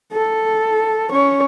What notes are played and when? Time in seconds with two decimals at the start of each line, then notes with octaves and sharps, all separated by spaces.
0.13 A4
1.11 C#4 C#5